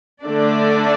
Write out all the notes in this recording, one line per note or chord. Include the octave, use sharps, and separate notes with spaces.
D3 A3 D4 D5